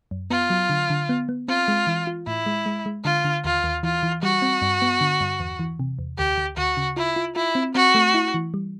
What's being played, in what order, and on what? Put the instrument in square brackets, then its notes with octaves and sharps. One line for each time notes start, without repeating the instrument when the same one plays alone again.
[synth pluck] F#2
[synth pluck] B3 [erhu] F4
[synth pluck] F#3
D3
D3
B3
B3
[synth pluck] C4 [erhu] F4
[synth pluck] G#3
E3
F4
[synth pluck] A2 [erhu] E4
[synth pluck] G#3
G#3
G#3
[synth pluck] D3 [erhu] F4
[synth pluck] D3
[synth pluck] D#2 [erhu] F4
[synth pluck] D#2
[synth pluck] E3 [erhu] F4
[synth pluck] E3
[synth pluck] G3 [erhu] F#4
[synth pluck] C4
G2
B3
D3
G2
E2
E3
C3
E2
[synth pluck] D2 [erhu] G4
[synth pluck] D2
[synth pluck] D2 [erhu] F#4
[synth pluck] C#3
[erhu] E4 [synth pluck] F4
[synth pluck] F4
[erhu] E4 [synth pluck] F4
[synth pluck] C4
[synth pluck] C4 [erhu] F#4
[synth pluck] A3
E4
E3
G3